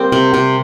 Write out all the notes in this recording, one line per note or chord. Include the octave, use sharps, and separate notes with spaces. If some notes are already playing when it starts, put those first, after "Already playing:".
Already playing: G3 A#3 C4
C3
C3